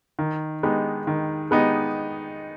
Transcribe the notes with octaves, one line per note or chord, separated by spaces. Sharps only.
D#3
G#3 B3 D#4 G4
D#3
G#3 B3 D#4 G4